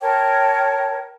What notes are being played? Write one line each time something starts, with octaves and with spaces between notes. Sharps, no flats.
A#4 C#5 G5 A5